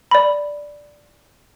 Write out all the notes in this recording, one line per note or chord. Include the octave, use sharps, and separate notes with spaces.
D5 B5